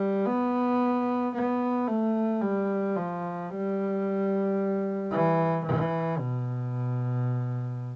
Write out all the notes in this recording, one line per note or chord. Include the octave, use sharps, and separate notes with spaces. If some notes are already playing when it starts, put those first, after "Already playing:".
Already playing: G3
B3
B3
A3
G3
F3
G3
E3
E3
B2